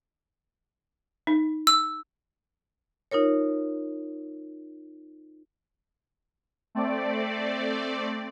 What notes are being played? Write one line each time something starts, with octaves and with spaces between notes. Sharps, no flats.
D#4
E6
D#4 F4 A#4 C#5
A3 C4 D5